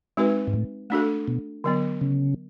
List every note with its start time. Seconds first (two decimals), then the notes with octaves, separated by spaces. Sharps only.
0.17 G#3 C4 D#4 F#4 B4
0.47 G#2
0.53 A2
0.90 A3 D4 F#4 A4
1.28 B2
1.64 D3 F#3 B3
2.01 C#3